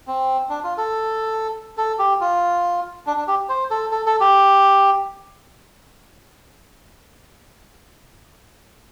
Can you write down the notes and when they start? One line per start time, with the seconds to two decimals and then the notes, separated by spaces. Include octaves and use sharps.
0.07 C4
0.49 D4
0.64 F4
0.78 A4
1.78 A4
1.99 G4
2.21 F4
3.06 D4
3.16 D4
3.28 G4
3.49 C5
3.71 A4
3.92 A4
4.06 A4
4.20 G4